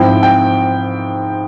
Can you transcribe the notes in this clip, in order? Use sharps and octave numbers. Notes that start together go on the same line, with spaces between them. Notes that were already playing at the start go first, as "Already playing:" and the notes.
Already playing: G#2 F3 C4 E4 G5
G5